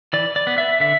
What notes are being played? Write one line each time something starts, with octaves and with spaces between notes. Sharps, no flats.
E3 D5
D5
B3
E5
D3 E5